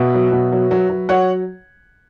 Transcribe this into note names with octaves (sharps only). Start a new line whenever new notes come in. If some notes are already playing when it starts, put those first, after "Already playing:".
Already playing: B2 B4 E5
F#3
B2
F#3
F#3
F#3
F#3 C#5 F#5